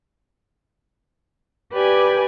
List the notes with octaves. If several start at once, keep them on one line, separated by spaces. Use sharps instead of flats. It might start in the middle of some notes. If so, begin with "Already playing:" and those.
G4 B4 D5 G#5